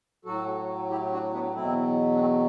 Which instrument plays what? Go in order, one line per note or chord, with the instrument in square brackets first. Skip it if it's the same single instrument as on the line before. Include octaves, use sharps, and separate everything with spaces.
[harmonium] A2 F#3 F#4 A4
E4 G4
D4 F#4
B3 D4
E2 B2 F#3 C4 E4
D4
A3 C4